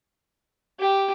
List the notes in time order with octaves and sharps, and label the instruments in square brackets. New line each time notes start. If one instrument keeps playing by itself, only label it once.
[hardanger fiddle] G4